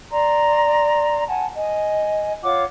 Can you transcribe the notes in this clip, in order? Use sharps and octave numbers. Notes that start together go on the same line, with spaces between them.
D5 A#5 C6
F#5 G#5 A5
D#5 G#5
F4 C#5 F#5 D6